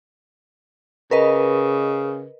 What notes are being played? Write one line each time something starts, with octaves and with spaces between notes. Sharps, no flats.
C#3 A#4 B4 D#5